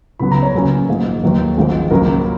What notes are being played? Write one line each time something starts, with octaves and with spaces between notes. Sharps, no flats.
C#2 C#3 F#3 B3 B5
A#5
C#5
C#2 C#3 F#3 A#3 C#4 B4
A#1 G#2 D#3
D#2 D#3 F#3 A#3 B4
G#1 G#2 F3 G#3
C#2 C#3 F#3 A#3 A#4